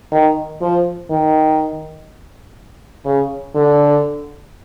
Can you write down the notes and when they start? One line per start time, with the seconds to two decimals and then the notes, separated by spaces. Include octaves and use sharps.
0.12 D#3
0.61 F3
1.10 D#3
3.05 C#3
3.55 D3